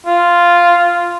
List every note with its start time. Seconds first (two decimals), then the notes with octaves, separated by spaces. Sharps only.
0.06 F4